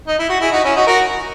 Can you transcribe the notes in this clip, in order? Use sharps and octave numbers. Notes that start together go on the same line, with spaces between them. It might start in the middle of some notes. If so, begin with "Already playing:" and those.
D#4
E4
F#4
E4 G#4
D#4 F#4
C#4 E4
D#4 F#4
F#4 A#4